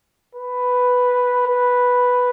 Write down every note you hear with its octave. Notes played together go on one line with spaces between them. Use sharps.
B4
B4